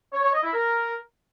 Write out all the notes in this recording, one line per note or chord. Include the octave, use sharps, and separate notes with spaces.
C#5
C#5
D#5
E4
A#4